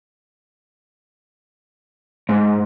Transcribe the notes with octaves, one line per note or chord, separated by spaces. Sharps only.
G#2